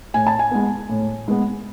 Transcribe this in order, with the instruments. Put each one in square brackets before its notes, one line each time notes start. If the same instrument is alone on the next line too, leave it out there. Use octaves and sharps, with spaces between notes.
[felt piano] A2 G#5
A5
G#5
G#3 B3
A2
G#3 B3